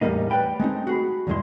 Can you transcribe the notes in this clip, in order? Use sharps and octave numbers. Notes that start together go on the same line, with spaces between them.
E2 A2 E3 G3 A#3 D#4
B4 C#5 D5 G5 B5
G#3 A3 C4 D#4
F#4 G#4 B5
E2 G2 B2 G#3 E4 C6